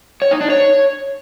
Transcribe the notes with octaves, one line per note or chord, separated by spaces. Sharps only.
C#5
D#4
D4
C#5